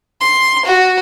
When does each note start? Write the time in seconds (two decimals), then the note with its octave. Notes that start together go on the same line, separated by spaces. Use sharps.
0.21 C6
0.65 F#4